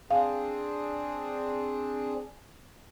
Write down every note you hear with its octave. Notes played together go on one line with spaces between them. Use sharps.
C4 D4 G#4 F5